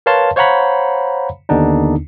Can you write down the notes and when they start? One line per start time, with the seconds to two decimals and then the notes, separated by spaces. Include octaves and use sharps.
0.06 A#4 B4 C#5 F5 A5 C6
0.36 C5 C#5 F5 F#5 A#5 B5
1.49 D#2 D3 B3 D4 D#4